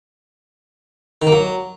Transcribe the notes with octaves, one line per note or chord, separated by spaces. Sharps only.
D#3
A#3
F#3